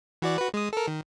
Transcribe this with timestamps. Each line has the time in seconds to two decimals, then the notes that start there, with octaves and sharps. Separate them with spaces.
0.22 E3 F#4 D5
0.38 F#4 B4
0.54 G#3 D#6
0.73 A4 A#4
0.88 D#3